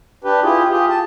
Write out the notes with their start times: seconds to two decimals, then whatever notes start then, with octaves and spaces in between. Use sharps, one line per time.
0.24 D4 G4 B4
0.43 E4 F4 G4 G#4
0.70 F4 G4 G#4
0.89 A5